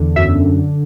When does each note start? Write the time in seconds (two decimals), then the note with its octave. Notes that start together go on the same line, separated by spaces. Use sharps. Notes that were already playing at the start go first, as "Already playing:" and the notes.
Already playing: E2 D3
0.16 F#2 E5